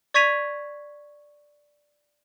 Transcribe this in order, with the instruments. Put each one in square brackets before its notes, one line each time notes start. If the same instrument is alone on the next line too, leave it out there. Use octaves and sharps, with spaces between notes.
[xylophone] D5 C#6 G#6 B6 D#7 F7